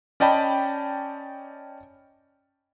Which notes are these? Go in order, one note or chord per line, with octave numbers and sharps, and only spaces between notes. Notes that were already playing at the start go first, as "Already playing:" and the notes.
C#4 D5 D#5 G5 A5 B5